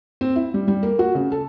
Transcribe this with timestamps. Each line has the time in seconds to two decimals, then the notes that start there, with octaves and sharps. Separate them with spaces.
0.21 C4
0.36 E4
0.54 G3
0.68 G3
0.83 A#3
0.99 F#4
1.15 C#3
1.32 A4